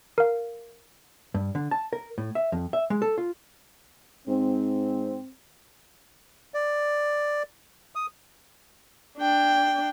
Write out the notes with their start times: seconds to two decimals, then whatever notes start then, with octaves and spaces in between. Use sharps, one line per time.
0.18 A#4 F5
1.34 G2
1.55 D3
1.71 A5
1.93 A#4
2.18 A2
2.35 E5
2.52 F2
2.73 E5
2.90 G#3
3.02 A4
3.18 F4
4.28 G#2 C4
6.54 D5
7.95 D#6
9.18 D4 G5